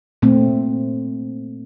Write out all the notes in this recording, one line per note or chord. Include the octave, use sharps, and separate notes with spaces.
A#2 A3 C4